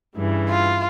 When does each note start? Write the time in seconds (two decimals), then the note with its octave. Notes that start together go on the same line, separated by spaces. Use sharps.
0.14 G2 C#3 E3
0.50 F4